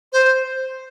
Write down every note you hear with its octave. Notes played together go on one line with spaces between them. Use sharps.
C5